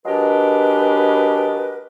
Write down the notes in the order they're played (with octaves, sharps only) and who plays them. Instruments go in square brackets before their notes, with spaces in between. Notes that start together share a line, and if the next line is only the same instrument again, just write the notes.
[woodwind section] F#3 G#3 D4 G4 A#4 B4